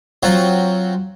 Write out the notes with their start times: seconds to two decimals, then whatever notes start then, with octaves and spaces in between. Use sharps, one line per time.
0.23 F#3 C4 F4 F#4